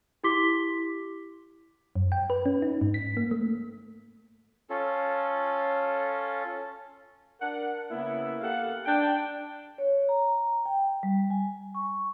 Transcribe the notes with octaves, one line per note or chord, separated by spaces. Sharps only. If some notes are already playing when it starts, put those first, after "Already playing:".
E4 G4 C6 D6 B6 G7
F#2
G5
B4
C#4
D#4
G#2
B6
A#3
A3
C#4 F4 A4
D4 A#4 F#5
C#3 A#3 B3 E4
A#3 G4 A4 F5 F#5
D4 G5
C#5
A#5
G5
G3
G#5
C#6